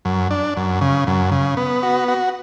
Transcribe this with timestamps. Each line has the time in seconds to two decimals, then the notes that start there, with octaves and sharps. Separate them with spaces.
0.05 F#2
0.31 D4
0.57 F#2
0.81 C#3
1.07 F#2
1.32 C#3
1.57 B3
1.83 F#4
2.08 F#4